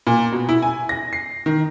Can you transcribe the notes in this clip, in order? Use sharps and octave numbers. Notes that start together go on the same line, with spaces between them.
A#2
B2
E4
G#5
A#6
C7
D#3